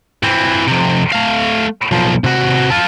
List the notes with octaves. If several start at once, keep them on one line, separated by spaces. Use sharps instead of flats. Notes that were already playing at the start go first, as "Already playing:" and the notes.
E3 C4
F2 C3
A3 F5
B1 F3
C3 F#4
F4 A4